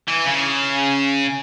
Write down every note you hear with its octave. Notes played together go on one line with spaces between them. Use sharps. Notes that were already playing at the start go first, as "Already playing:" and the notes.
E3
C#3